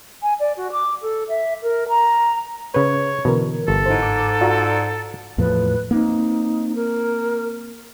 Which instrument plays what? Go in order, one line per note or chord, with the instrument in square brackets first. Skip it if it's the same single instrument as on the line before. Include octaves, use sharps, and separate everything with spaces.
[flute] G#5
D5
F#4
D6
A4
E5
A#4
A#5
[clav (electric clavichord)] C#3 B4 [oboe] C#5
[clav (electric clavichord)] B2 [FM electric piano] D3 E3 A#4
[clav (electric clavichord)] G1 [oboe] A4
[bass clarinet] G#2 [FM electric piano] D#4 E4 C5
[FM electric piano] D6
[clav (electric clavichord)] F4 F#4 [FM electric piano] D5 A#5 E6
[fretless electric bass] E2 A2 F3 [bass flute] B4
[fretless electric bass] A#3 C4 [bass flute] D#4
[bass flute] A#4